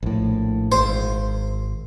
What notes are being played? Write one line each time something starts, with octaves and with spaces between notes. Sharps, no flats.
A#1 A2
G#1 C5